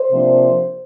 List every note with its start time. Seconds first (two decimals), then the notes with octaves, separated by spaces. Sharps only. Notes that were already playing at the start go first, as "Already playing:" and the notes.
Already playing: C5
0.12 C3 F3 A#3 D4